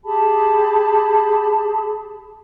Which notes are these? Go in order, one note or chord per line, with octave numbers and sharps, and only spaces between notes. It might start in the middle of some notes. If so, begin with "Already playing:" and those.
G4 G#4 A5 B5